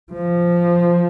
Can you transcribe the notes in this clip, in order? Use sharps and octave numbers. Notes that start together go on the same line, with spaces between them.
F3